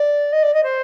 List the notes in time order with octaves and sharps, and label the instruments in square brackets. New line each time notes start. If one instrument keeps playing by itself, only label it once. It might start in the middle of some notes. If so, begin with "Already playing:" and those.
Already playing: [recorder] D5
D#5
D5
D#5
C5